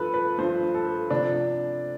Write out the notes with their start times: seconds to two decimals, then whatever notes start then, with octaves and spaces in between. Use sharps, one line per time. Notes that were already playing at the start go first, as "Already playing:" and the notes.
Already playing: G2 F3 A4 B4
0.14 B4
0.38 G2 F3 C5
0.74 A4
1.10 C3 F3 D4